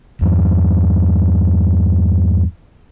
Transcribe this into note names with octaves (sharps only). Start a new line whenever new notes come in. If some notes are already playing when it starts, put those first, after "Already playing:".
E2 G2